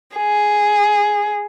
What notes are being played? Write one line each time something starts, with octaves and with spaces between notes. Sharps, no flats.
G#4